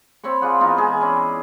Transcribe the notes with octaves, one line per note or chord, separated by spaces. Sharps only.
C4 C#5 B5 C#6
F4 G#4 D5 F#5
E3 B3 D#4 F4
G#3 G#4
C#4 E4 D5